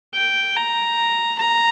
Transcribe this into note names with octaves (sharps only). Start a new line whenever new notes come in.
G5
A#5
A#5